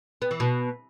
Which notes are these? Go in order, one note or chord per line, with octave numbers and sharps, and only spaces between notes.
B3
E3
B2